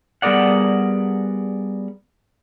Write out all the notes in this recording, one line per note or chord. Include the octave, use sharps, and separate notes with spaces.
G3 B3 G#4 A#4 D5 F#5